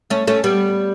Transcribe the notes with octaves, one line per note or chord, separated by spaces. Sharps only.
A3 C#4
A3 C#4
G3 B3